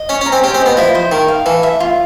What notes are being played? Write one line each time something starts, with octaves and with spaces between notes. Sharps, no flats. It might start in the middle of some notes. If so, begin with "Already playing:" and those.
Already playing: D#5
C#4 C#5
C#4
A#5
C4
C#4 G4
C4
B3 D#5
F3 E4
C5
D#3 A#4
F5
E3 A4
E5
F4